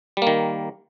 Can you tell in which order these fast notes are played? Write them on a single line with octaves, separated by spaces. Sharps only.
G3 A#3 D#3